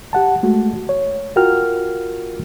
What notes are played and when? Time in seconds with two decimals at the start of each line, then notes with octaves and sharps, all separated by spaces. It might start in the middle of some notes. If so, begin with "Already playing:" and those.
0.13 G4 F#5 A5
0.43 G#3 A3 F#4
0.89 C#5
1.36 F4 F#4 A#4 G5 F6